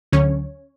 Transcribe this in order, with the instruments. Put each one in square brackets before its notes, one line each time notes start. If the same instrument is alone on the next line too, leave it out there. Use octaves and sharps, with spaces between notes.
[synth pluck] D2 D3 F#3 C#4 C#5